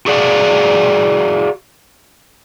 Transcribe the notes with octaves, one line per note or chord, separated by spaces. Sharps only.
F#4 G#4 D5 F5 F#5